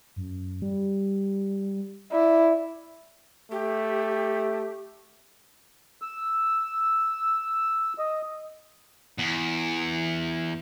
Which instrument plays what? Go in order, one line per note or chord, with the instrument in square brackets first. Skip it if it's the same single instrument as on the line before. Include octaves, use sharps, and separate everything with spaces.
[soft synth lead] F#2
G3
[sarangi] E4 [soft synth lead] D5
[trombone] A3 [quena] G4
[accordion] E6
D#5
[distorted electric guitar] E2